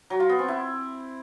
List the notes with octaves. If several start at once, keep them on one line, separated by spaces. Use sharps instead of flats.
F#3
F4
B3
C4
E4